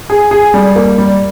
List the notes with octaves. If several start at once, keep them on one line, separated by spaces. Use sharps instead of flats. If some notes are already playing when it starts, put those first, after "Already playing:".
G#4
G#4
G3
A#3
G3